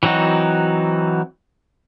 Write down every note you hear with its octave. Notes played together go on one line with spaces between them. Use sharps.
E3 F#3 C4 D#4 F#4